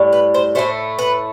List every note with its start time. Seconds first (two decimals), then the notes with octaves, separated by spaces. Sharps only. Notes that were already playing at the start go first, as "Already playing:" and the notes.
Already playing: A2 G3
0.13 B4
0.34 C5
0.55 A2 F3 A3 C5
0.99 B4